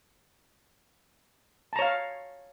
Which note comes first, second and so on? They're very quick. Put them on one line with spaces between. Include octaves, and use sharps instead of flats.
A5 A#5 C#5 F5